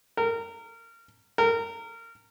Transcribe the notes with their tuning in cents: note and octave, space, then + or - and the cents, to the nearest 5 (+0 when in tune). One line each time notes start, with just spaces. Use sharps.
A#4 -25
A#4 -25